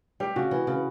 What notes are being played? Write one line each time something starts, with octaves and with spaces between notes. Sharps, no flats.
G3 G4
C#3 F#4
E3
C#3